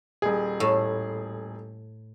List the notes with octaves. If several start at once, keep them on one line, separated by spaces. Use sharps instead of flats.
D#1 G#4
A2